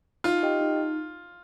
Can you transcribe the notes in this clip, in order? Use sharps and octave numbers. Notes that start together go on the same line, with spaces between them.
D#4 F4
G4 D#5 G5
D#4